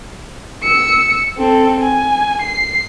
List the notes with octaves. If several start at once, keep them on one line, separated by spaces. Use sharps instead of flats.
E6 C#7
C4 A4
G#5
C7